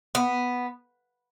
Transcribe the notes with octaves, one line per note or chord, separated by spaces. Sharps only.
B3